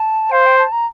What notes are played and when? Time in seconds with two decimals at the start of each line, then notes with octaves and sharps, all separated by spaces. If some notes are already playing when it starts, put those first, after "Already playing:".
Already playing: A5
0.32 C5 F5
0.46 G5
0.58 A5
0.72 A#5